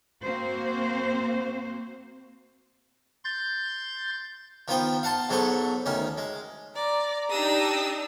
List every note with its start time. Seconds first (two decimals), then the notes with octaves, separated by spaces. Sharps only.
0.22 A#3 C4 F#4 C5
3.24 C6 G6 A6
4.68 D#3 F3 B3 C5 G5
5.03 F5 F#5 A5 C6
5.29 G#2 F#3 B3 A4 C5 C#6
5.86 D2 D#3 C#4
6.18 G#3
6.76 D5 A#5
7.30 D4 D#4 G4 D#6 E6